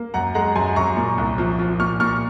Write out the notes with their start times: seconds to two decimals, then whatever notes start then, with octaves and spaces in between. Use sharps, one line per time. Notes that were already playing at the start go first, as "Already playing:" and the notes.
Already playing: A#3
0.14 F#2 F#5 A#5
0.34 G#3 F#5 A#5
0.56 F#2 G#5 C6
0.76 F#2 A#5 C#6
0.97 A#2
1.18 C2
1.38 F3
1.59 F3
1.79 A#2 C#6 F6
2.00 A#2 C#6 F6